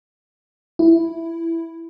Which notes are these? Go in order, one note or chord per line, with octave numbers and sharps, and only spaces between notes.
E4